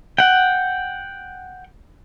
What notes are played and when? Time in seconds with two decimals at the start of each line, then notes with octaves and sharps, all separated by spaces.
0.18 F#5 G5